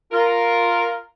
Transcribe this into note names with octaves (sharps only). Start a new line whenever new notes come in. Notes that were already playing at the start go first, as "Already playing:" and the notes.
F4 A#4